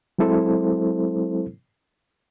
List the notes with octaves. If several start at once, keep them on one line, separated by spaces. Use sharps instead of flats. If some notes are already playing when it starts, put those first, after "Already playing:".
F#3 G#3 C4 E4 A4 C5